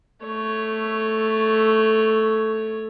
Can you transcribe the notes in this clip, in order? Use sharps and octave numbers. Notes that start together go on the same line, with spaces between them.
A3 C#5